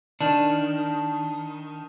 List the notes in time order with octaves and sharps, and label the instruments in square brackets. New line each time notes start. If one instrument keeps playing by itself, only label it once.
[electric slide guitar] D#3 D4